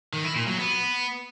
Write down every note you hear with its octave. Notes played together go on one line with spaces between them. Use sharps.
D#3
E4
A#2
F#3
B3